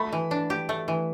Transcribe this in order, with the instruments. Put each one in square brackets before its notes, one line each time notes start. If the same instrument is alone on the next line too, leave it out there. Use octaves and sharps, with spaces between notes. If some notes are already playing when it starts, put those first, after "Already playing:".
Already playing: [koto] A3 [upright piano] B5
[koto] E3
D4
G4
A3
E3